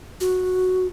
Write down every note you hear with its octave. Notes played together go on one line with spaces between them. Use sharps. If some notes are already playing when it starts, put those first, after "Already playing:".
F#4